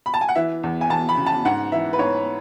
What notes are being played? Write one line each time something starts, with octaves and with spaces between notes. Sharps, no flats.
B5
A5
G#5
F#5
E3 E5
E2
G#5
E2 A5
B5
C#3
A5
G#2 F#5
E3 E5
B4
G#2 C#5